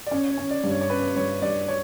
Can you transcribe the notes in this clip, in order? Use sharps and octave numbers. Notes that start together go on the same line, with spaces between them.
D5
C#4 C#5
C#5
C#4
D5
G2
C#5
C#5
C#4 B4
G2 C#5
G2 D5
C#5